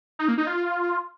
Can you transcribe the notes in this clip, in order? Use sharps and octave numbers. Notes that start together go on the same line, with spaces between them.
D#4
A#3
D#4
F4